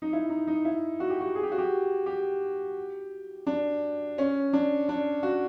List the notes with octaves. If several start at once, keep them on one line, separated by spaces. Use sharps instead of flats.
D#4
E4
D#4
D#4
E4
F#4
G4
F#4
G#4
G4
F#4
G4
G4
D4
C#4
D4
D4
F#4